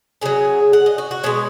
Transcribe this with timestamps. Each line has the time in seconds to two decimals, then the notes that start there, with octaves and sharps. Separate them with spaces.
0.21 C#3 F#3 G#4
0.73 F#5
0.86 D#5
0.98 F#4
1.11 F#4
1.23 B2 G#3 C#5